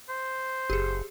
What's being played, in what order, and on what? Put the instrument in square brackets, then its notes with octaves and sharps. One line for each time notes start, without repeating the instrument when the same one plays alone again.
[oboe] C5
[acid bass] F#1 [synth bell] G4 G#4